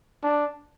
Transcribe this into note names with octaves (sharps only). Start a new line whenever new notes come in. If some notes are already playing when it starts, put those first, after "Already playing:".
D4